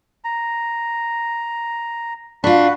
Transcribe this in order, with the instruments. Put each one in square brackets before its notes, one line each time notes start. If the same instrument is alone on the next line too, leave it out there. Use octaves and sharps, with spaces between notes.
[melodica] A#5
[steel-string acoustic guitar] D4 F4 [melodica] F#4 F#5 B5